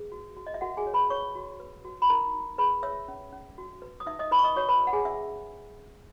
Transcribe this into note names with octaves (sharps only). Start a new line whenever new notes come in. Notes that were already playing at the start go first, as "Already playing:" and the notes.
Already playing: G#4 B4
F#4
F#4
D#5
E5
F#4 A#4 F#5
G#4 G#5
C#5
B4 B5
B4 C#5 C#6
F#4
B4
F#4
B5
D#4 A#4 A#5
D#4
G#4 B4 B5
C#5 E5 E6
C#4
C#4
F#4
B4
D#6
D#4 E5 E6
D#5 D#6
D#4 B4 B5
C#6
D#5 D#6
F#4 C#5 C#6
B4 B5
B4
F#5
G#4 G#5
C#4 E5 E6